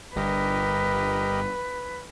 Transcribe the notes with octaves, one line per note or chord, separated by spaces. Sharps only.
G1 G2 G4 A#4 B4 D#5